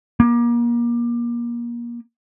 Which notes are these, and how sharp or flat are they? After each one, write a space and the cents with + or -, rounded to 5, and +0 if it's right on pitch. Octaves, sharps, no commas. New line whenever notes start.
A#3 +30